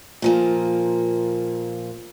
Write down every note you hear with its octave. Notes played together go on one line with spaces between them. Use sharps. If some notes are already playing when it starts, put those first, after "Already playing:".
A#2 F3 A#3